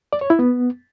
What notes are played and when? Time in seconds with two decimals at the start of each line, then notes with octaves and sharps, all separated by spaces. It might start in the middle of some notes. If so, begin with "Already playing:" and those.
0.13 D5
0.21 C#5
0.30 E4
0.39 B3